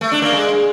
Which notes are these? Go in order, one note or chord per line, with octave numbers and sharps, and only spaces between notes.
A3
D4
A#3
G#3